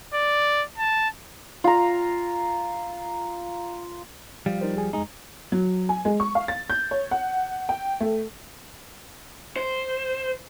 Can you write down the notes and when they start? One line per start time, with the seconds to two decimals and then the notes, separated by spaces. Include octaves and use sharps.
0.14 D5
0.78 A5
1.64 F4 A#5
4.46 F3 G3 F5
4.61 D#4 A#4 C5
4.75 C#2 G#4 G#5
4.93 F2 G#3 D#4 G#4 A#5
5.52 F#3
5.89 G#5
6.05 G#3
6.20 C#6
6.35 F5
6.48 A6
6.70 G6
6.91 C#5
7.11 F#5
7.69 G5
8.00 A3
9.56 C5